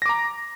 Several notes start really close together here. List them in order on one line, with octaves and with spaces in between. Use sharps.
A#6 D6 A#5